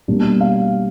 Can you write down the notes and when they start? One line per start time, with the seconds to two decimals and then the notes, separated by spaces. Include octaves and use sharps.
0.08 B2 G3 A#3 D4
0.41 F5